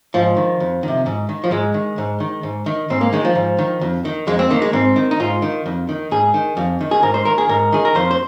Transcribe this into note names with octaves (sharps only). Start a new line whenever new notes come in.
G#2 F3
D#3
F2
C3 D#3
G#2
D#3
F3
G#2 G#3
D#3
G#2
D#3
G#2
D#3
G#2 C4
A#3
D#3 G#3
F3
G#2
D#3
F2
D#3
F2 G#3
C4
D#3 A#3
G#3
G#2 C4
D#3
D#4
G#2 F4
D#3
F2
D#3
G#2 G#4
D#3
F2
D#3
G#4
G#2 A#4
C5
D#3 A#4
G#4
G#2 A#4
D#3 G#4
A#4
F2 C5
C5